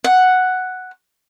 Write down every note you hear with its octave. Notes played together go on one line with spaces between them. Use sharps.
F#5